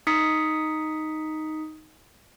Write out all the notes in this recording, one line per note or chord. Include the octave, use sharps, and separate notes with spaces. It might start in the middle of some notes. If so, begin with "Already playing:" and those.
D#4 D#6 B6 C#7